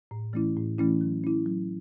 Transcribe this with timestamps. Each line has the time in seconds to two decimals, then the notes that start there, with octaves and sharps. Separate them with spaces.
0.11 A2
0.33 E3 A3 C#4 E4
0.57 A2
0.78 E3 A3 C#4 E4
1.01 F#3
1.24 C#4 E4
1.46 F#3